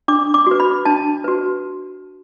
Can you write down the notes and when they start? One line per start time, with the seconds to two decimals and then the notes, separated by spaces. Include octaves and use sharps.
0.08 D4 D6
0.34 D6
0.47 F#4 B4
0.60 B5
0.85 D4 A5
1.24 F#4 B4